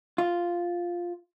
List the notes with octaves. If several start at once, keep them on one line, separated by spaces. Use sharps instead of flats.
F4